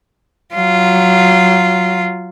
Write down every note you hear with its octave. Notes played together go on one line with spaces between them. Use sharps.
F#3 F4